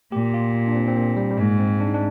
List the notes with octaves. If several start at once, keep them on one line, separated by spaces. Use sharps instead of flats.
A#2 G4
F4
D4
C4
C4
A#3
G3
G3
G#2 G#3
C4
D4
D#4
D4